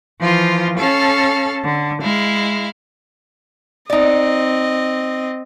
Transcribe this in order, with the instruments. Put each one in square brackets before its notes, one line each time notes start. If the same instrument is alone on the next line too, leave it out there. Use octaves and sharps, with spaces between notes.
[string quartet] E3 F3 F4
C#4 A4 F5 A5
D3
G#3 E4 F5
[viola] C4 D#5 [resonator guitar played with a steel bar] D#4 D5